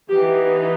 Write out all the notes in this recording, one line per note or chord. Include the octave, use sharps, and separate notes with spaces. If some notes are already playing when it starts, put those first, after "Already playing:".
E3 B3 D#4 G4